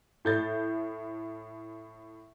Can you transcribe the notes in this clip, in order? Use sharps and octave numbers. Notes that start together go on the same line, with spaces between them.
A2 G6 A6